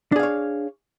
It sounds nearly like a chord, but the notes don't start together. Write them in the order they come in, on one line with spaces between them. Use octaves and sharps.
D4 G#4 F5 C#5